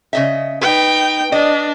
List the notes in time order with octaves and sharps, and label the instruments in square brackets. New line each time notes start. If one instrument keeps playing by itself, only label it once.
[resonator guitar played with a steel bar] C#3 D#5 E5
[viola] D#4 G5 [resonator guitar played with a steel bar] B4
[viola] D4 [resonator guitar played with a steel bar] D#5